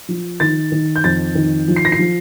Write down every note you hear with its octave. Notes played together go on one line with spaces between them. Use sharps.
F3
D#3 A6
D#3
G6
F2 A6
D#3
F3
C7
A#6
C7
F3